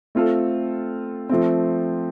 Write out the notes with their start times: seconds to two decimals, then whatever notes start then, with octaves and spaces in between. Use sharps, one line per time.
0.15 A3 C4 F4 A4
1.30 F3 A3 C4